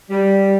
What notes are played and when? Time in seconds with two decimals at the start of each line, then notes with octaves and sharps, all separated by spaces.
0.10 G3